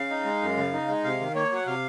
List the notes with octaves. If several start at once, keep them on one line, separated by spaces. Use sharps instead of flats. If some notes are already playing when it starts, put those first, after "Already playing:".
Already playing: C#3 F5
D#4
G#3
F#2
C#3
D#4
G#3
C3 F5
D#3
A#3 C#5
F#3 F#5
C3 F5